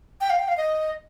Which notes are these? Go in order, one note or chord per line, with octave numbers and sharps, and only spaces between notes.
G5
F5
G5
F5
D#5